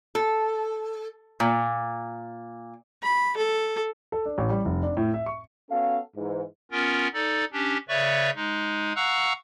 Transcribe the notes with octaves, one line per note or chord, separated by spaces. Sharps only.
A4
A#2
B5
A4
A4
D4
A1
G3
F1
D4
A2
E5
C#6
B3 C#4 F#4 A4 F5
G#2 E3
B3 C#4 F4 A#4
D#4 A4 D5
C#4 D4 G4
C#3 B4 C#5 D5 E5 C#6
G#3 D#4
F5 F#5 A#5 C#6 E6 F#6